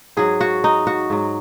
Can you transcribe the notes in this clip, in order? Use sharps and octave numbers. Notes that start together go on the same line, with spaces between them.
G#2 F#3 G#4
F#4
D#4
F#4
G#2 F#3